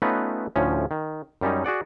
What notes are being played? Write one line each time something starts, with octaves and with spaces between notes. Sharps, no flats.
A3 B3 C#4 D#4 F4 B4
D2 A2 F3 C#4
D#3
F#2 G3 C#4 D#4
F#4 G#4 D5 F#5